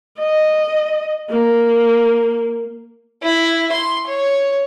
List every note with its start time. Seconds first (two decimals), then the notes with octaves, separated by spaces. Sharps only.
0.19 D#5
1.30 A#3
3.23 E4
3.72 C6
4.07 C#5